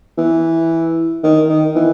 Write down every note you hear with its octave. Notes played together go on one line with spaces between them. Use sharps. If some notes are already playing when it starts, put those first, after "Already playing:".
E3
D#3
D#3
E3